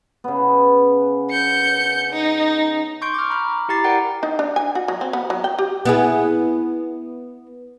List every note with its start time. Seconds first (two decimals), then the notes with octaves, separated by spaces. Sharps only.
0.24 C#3 B3
1.30 G6 C#7
2.12 D#4
3.02 C6 C#6 G6 D7
3.14 D6 F6
3.30 A#5 B5 F6
3.69 E4 G4 A#5 A6 C7
3.84 A#4 D5 F#5 G5
4.23 D#4
4.39 D4
4.56 G#5
4.75 F#4
4.88 F#3
5.01 C4
5.13 B3
5.30 F#3
5.44 G5
5.59 G4
5.85 B3 E4 G#4